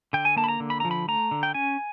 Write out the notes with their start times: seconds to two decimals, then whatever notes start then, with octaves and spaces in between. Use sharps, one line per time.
0.13 D3 G5
0.25 G#5
0.36 A#3 A5
0.44 B5
0.48 A#5
0.60 D3
0.70 B5
0.80 F3 A#5
0.91 B5
1.08 A3 A#5
1.31 D3
1.43 G5
1.54 C#4 G#5